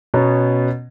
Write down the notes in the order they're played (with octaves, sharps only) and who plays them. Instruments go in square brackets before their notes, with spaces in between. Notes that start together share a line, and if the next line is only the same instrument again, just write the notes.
[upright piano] B2 B3 C#4 C#5 A#5